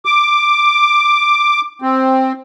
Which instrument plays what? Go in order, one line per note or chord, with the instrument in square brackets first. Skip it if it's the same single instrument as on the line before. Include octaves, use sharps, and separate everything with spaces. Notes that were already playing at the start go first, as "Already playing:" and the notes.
[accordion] D6
C4